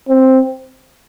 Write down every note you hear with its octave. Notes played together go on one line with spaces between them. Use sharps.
C4